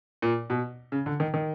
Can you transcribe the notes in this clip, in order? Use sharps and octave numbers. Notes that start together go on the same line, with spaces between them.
A#2
B2
C#3
D3
D#3
D#3